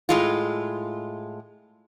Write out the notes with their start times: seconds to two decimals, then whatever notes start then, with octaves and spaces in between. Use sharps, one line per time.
0.09 A2 G#3 F4